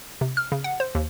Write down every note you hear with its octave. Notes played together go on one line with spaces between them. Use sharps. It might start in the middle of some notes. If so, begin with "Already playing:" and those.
C3
F6
C#3
F#5
C5
D#2